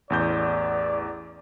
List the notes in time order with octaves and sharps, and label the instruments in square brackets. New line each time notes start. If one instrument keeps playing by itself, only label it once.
[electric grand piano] A1 E2 G6 [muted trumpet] D5